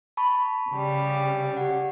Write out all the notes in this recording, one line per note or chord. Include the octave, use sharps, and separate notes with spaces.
A5 B5 C#6
C#3 G3
G4 F#5